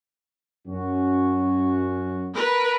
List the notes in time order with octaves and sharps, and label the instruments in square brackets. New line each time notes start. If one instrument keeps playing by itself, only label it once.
[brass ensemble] F#2 C#4 F#4
[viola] A#4 B4